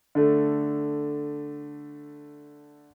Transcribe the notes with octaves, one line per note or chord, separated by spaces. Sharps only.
D3 A3